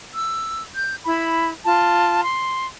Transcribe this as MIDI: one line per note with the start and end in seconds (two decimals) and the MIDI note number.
0.14 0.64 88
0.74 0.95 91
1.05 1.51 64
1.05 1.51 83
1.65 2.22 65
1.65 2.22 81
2.23 2.65 84